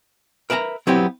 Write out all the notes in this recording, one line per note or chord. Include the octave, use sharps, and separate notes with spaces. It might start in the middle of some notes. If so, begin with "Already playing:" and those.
A#4 B4 E5 A5 A#5
F#3 B3 C4 E4 G4